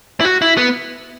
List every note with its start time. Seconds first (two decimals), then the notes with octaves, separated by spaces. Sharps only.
0.21 E4
0.25 F#4
0.42 E4
0.57 B3